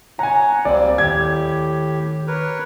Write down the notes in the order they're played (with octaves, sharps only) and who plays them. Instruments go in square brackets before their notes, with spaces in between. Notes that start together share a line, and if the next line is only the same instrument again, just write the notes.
[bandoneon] C#5 F#5 [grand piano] G#5 A#5
[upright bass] C#2 [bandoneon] G3 A#3 C4 [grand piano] D5
[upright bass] D#2 D#3 [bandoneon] A2 G4 [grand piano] G#6
[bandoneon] A#4 B4 C#5